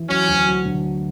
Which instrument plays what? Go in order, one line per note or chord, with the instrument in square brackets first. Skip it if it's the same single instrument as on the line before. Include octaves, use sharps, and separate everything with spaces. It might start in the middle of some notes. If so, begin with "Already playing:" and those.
Already playing: [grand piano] E3
[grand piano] F#3 [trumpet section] C#4
[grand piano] D2
F#3
D3